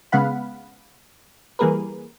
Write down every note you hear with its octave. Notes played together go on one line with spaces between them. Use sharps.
C#3 G#3 B3 F5 F#5 B5
E3 G3 A#3 G#4 A#4 B4